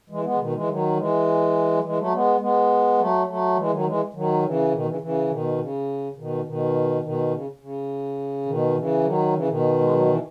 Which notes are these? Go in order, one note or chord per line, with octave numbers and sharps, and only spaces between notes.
E3 G#3
G#3 B3
E3
B2 D#3
E3 G#3
D#3 F#3
E3 G#3
F#3
E3 G#3
F#3 A3
G#3 B3
G#3 B3
F#3 A3
F#3 A3
E3 G#3
D#3 F#3
E3 G#3
D#3 F#3
C#3 E3
B2 D#3
C#3 E3
C#3 E3
B2 D#3
C#3
C#3
B2 D#3
B2 D#3
B2 D#3
C#3
C#3
B2 D#3
C#3 E3
D#3 F#3
C#3 E3
B2 D#3
G#3
F#3
E3